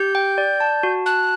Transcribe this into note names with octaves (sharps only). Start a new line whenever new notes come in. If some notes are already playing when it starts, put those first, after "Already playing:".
Already playing: G4 G6
G5
D5
A5
F#4
A5 F#6